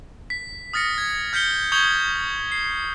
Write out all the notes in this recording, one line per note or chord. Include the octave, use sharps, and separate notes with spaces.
B6
D#6 F6 A6 A#6 C#7
G#6
F6 G6 B6 C#7 G7
C#6 D#6 G6 G#6 F7 G7
C7